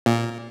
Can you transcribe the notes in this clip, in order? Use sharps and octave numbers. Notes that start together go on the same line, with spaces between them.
A#2